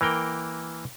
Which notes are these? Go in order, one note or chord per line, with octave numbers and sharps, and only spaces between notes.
E3 A#3 A#4 G5